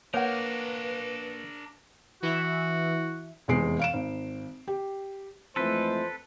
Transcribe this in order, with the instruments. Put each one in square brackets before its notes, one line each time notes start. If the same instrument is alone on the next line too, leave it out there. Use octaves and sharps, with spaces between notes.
[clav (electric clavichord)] A#3 [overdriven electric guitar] D4 A#4 [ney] B4 [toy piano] C#5 F#5
[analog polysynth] E3 E5 [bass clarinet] F#4
[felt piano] F1 E2 E3 G#3 C7 D7
F5 D7 E7
G#1
G4
[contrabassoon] F2 [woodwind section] E3 G#3 A3 [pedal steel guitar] A4 B4 [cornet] C5